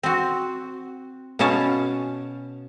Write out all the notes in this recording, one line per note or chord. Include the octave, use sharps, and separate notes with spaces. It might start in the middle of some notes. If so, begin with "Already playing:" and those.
C4 F#4
B2 B3 C#4 F5 A5